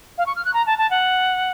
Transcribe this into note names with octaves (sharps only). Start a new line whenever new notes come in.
F5
C#6
F6
F#6
A#5
A5
A5
F#5